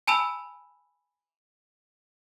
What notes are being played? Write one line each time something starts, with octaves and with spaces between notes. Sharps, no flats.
G#5 A5 B5 E6 F7